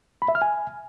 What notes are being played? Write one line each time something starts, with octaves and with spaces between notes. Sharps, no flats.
B5
E5
F6
G#5